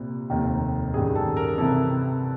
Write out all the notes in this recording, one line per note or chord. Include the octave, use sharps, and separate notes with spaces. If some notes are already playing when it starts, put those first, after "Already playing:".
Already playing: C2 A#2
F1 D#2 D#3
A1 G2 D#3 G#4
A4
A#4
C2 C3 E3 A4